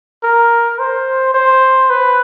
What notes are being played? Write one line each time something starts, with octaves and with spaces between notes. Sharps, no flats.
A#4
C5
C5
B4